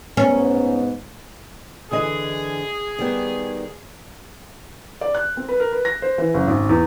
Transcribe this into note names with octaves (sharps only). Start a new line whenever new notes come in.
G#2 B3 C#4
D3 E3 G#4 D#5
D#3 G3 B3
D5
F#6
C4
B4
A#4
B4
A#6
C5
E3
F#1
G#1
E2